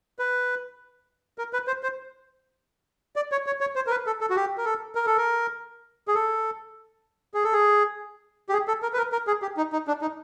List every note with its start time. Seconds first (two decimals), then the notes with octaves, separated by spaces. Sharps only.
0.19 B4
1.38 A#4
1.53 B4
1.67 C5
1.83 C5
3.16 D5
3.32 C#5
3.46 C#5
3.61 C#5
3.76 C5
3.87 A#4
3.91 B4
4.07 A4
4.21 A4
4.30 F#4
4.36 G4
4.58 A#4
4.65 A4
4.95 A#4
5.06 A4
5.17 A#4
6.08 G#4
6.15 A4
7.34 G#4
7.44 A4
7.53 G#4
8.49 G4
8.53 G#4
8.68 A4
8.82 A#4
8.93 B4
8.97 A#4
9.12 A#4
9.27 G#4
9.42 G4
9.57 D#4
9.73 D#4
9.88 D4
10.02 D#4